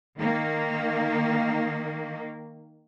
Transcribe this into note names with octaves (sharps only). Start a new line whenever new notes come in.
D#3 A#3